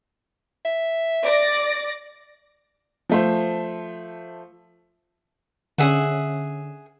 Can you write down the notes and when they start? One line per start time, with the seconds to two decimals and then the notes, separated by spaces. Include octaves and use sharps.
0.65 E5
1.24 D5 A#6
3.09 F3 A3 C5
5.78 D3 C#4 G#4 E5 F#5